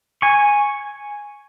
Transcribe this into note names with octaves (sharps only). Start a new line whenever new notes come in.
G#5 C#6